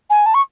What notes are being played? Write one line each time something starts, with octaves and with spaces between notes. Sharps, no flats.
G#5
A5
C#6